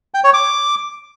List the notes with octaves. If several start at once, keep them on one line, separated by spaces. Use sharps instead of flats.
G5
C#5
D6